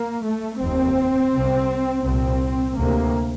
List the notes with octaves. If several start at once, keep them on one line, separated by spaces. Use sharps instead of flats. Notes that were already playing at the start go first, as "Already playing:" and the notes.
Already playing: A#3
A3
F1 D#2 C4
C2 C3
C2 A#2 C4
D2 C3 A#3